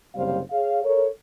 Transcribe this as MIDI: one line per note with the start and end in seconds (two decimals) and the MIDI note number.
0.15 0.40 30
0.15 0.40 48
0.15 0.40 55
0.15 0.40 72
0.15 0.40 77
0.51 0.79 68
0.51 0.79 73
0.51 0.79 77
0.83 1.07 69
0.83 1.07 70
0.83 1.07 73